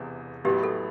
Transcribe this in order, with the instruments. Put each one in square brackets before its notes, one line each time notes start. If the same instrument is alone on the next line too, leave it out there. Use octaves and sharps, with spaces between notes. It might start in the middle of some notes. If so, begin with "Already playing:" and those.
Already playing: [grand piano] E1 E2 C3
[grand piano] A1 A2 F#3 B3 [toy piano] G4
[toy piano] A4